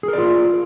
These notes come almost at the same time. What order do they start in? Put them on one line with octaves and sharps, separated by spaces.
G#4 A#4 D5 F4